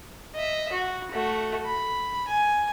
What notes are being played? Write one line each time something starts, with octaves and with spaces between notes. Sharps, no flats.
D#5 E5
F#4
A3 F#4
B5
G#5